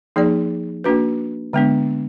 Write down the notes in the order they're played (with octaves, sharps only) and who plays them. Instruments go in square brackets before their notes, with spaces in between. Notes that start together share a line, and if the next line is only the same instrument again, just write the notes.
[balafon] F3 A#3 D#4 G#4 D5
A#3 D4 F#4 B4
D3 G#3 B3 D4